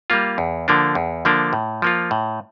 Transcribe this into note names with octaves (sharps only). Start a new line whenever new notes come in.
G3 A#3 F4
E2
D3 F3 A#3 D4
E2
D3 F3 A#3 D4
A2
F3 A#3 F4
A2